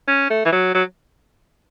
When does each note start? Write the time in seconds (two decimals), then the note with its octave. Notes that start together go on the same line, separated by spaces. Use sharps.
0.08 C#4
0.30 A3
0.45 E3
0.52 F#3
0.74 F#3